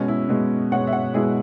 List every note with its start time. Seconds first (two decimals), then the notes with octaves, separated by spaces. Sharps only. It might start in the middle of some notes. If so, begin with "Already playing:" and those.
Already playing: B2 G#3 C#4
0.08 E4
0.29 B2 G#3
0.72 B2 G#3 C#5 F#5
0.87 E5
0.93 C#5 F#5
1.14 B2 G#3 E4 G#4